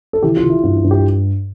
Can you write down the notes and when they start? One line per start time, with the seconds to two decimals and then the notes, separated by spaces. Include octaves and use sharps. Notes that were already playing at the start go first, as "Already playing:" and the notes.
0.13 A4
0.23 E3 G4
0.37 F4
0.43 E3
0.50 E4
0.63 G2 F4
0.77 F4
0.84 G2
0.91 G4